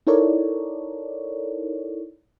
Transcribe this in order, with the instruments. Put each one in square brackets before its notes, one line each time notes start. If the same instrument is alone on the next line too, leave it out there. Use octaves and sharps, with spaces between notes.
[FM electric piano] D#4 E4 A4 A#4 C#5 D5